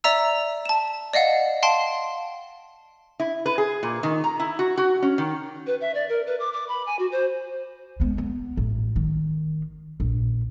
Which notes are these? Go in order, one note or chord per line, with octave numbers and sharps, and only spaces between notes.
D5 E5 A#5 E6
A5 E7
D5 D#5 F5 F#5
F5 G5 A5 C6
E4
B4
G#4
A#2
D#3
A#5
E4
F#4
F#4
C#4
D#3
B4
E5
D5
A#4
B4
D6
D6
B5
G#5
F#4
C5
G#3 B3
B3
A1
D#3
A#1